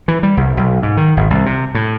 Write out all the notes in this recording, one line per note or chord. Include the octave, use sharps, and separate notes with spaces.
E3
G3
C2
B1
G#2
D#3
G#1
C2
C3
A2